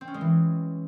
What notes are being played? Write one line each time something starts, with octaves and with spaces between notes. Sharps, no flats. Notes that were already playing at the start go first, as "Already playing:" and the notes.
C4
C#4
G#3
E3